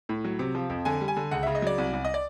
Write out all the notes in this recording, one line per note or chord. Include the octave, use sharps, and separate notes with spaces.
A2
F#3
C3
F3
F2
D3 G#5
G3
G#5
D3
C#2 F#5
C#3 E5
D#5
F#3 D5
C2
C2
D#5
D5